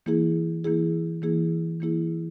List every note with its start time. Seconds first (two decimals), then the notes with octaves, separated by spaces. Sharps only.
0.06 E3 A#3 E4 G#4
0.64 E3 A#3 E4 G#4
1.22 E3 A#3 E4 G#4
1.81 E3 A#3 E4 G#4